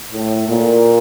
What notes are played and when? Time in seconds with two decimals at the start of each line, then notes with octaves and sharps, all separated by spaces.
0.12 A2
0.47 A#2